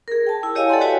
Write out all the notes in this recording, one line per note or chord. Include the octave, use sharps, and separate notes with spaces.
G#4 A#4
G5 A5
E4
G4 C#5 D#5 F5 G5 G#5
A4 D5 F#5 A5 C6
F#4 B4 C#5 G5 G#5